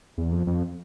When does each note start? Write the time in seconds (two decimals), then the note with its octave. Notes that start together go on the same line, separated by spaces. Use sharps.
0.18 E2
0.32 F2
0.47 F2